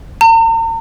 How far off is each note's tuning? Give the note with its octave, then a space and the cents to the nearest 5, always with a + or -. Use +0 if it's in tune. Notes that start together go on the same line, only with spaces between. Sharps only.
A#5 -45